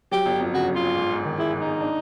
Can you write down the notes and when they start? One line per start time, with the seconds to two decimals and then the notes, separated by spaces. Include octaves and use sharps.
0.12 F#3 G4
0.26 G1
0.40 F2
0.54 C#3 F#4
0.68 F#3
0.75 F4
0.83 G1
0.96 G#2
1.11 G#2
1.25 D#3
1.39 G#3 E4
1.53 G#2
1.60 D#4
1.67 G#2
1.81 D4